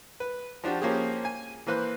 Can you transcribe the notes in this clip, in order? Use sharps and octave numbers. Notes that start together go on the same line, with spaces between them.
B4
F3 D4 F#4 G4
F3 A#3 C#4 G4 G#4
G#5
E3 A#3 B4 C5 F#6